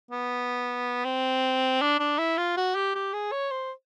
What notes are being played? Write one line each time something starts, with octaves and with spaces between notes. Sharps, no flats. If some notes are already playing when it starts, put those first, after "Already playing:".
B3
C4
D4
D4
E4
F4
F#4
G4
G4
G#4
C#5
C5